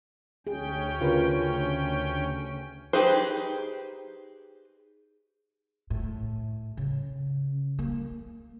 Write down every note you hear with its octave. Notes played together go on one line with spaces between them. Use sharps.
D2 C#4 G#4 G5
C#3 F4 A#4 B4
D#4 G4 G#4 B4 C5
A2
C#3
A#3